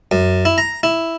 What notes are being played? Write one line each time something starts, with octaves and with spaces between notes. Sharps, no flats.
F#2
E4
A#5
E4